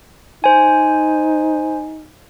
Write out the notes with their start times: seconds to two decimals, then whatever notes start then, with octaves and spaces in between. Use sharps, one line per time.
0.44 D#4 C5 G#5